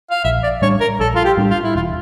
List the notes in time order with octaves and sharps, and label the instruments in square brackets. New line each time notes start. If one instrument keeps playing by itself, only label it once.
[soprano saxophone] F5
[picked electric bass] A#1 [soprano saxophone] E5
[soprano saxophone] D5
[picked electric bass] A2 G3 D4 [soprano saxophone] C#5
[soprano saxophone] A#4
[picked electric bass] A#1 [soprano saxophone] A4
[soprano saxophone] F4
G4
[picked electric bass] A2 G3 D4
[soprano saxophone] F4
E4
[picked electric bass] E1 [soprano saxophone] F4